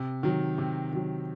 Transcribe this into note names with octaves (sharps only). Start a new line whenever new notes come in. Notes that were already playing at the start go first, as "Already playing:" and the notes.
Already playing: C3
D#3 F#3
C3
D#3 F#3